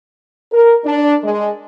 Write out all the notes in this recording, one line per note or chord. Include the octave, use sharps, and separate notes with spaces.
A#4
D4
G#3